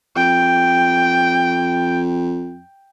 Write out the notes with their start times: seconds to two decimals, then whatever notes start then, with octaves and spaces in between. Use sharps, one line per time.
0.16 F2 G5